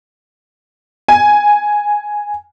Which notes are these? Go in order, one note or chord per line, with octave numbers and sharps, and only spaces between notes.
G#5